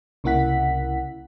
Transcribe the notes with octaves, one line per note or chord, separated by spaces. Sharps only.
C2 C#3 A#3 E4 F#5 B6